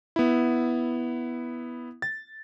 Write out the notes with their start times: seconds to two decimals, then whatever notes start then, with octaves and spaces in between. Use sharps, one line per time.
0.16 B3 E4
2.02 A6